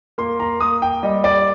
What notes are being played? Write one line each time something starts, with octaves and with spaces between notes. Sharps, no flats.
A#3 C6
A#5
A#3 D#6
G5
G3 D#5
D5